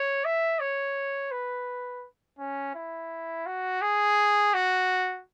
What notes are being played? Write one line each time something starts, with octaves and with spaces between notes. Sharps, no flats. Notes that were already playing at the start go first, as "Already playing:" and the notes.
Already playing: C#5
E5
C#5
B4
C#4
E4
F#4
G#4
F#4